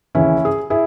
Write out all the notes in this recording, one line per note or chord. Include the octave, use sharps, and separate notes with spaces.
D#2 C#3 E3 C#4 E4
G#4
E4 G#4